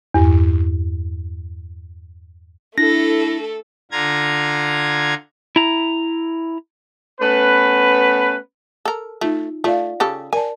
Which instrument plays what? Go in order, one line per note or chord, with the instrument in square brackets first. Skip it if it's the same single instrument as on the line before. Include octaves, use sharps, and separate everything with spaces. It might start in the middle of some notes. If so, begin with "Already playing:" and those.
[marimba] E2 G2
[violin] A3 A4 [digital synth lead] D4 [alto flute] E4 [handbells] A#6
[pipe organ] D3 F4 A#5 G#6
[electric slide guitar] E4 A#5
[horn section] A3 B3 C#4 B4
[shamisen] A4 A#4
[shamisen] A3 [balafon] D#4 F4
[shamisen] A3 [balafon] F4 D5 F5
[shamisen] C#3 G4 A4
[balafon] A#4 D5 A5 [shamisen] G#5